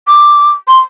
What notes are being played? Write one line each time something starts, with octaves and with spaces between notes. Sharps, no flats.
D6
C6